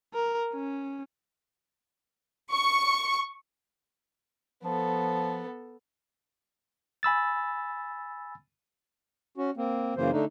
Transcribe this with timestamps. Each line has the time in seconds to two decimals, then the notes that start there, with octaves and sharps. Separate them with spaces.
0.13 A#4
0.54 C#4
2.52 C#6
4.64 F3 B3 A4
7.03 G#5 B5 E6 A6
9.37 C#4 F#4
9.57 A#3 C4
9.96 F#2 C#3 E3 A#3 C5
10.12 D3 A3 D4 D#4